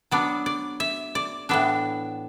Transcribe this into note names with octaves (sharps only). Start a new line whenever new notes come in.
F#3 B3 D4 D5
D5
E5
D5
A2 E3 B3 D4 E5